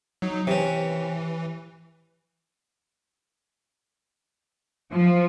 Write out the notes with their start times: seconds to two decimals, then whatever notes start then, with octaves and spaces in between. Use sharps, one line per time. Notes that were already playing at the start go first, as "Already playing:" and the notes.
0.22 F#3 D#4
0.47 C3 E3 C#4
4.93 F3